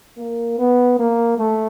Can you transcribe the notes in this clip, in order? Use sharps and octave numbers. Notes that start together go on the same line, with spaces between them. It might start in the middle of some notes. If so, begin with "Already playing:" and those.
A#3
B3
A#3
A3